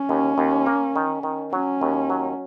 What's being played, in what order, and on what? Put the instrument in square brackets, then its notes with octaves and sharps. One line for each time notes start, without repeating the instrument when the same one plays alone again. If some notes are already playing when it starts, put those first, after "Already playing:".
Already playing: [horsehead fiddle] C#4
[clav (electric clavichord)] D#2
D#2
A#3
D#3
D#3
[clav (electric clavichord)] F#3 [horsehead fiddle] C#4
[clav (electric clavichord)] D#2
F#3